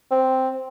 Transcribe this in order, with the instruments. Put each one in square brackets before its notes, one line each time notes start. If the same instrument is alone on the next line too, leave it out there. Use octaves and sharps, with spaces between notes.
[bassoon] C4